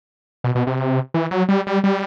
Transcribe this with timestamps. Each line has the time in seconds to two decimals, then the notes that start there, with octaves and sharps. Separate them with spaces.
0.44 B2
0.55 B2
0.67 C3
1.14 E3
1.31 F#3
1.49 G3
1.67 G3
1.84 G3